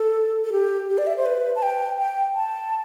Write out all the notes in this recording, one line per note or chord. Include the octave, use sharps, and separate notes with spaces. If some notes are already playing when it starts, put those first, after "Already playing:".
Already playing: A4
A4
G4
G4
D5
E5
C5
B4
A5
G5
G5
A5